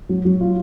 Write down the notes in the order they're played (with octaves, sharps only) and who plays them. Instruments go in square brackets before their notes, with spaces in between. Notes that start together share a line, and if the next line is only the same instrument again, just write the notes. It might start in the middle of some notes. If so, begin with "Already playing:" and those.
[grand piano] F#3
F#3
F4